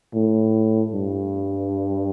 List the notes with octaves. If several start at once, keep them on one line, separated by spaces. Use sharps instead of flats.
A2
G2